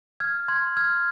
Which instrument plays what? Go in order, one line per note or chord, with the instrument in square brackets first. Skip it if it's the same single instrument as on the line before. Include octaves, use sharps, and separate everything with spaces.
[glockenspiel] F6 G#6
C6 G#6
F6 G#6